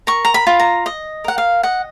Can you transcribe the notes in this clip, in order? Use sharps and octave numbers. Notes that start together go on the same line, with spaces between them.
A#4 C#6
A#5
B5
F4
A#5
D#5
A#4 F#5
F5
D#5 F#5